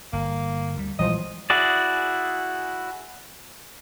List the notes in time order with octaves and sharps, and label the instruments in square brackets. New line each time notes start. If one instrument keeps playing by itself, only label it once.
[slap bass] G1 [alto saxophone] A#3
[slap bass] D2 G3
[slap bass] A#1 G3 G#3 [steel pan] E3 F3 C5 [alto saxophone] D#5
[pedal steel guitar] E4 F#4 G#4 D5